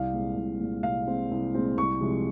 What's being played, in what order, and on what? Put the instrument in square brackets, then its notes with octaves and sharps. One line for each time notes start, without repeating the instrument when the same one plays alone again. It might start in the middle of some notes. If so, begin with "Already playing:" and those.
Already playing: [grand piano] C2 F5
A#2 G#3 C4
C2
A#2 G#3 C4
C2 F5
A#2 G#3 C4
C2
A#2 G#3 C4
C2 C#6
C3 F3 G#3